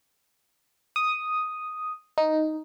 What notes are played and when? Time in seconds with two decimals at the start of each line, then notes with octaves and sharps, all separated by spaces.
0.96 D#6
2.18 D#4